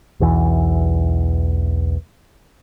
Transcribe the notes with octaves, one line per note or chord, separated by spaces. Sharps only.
B1 E2 E3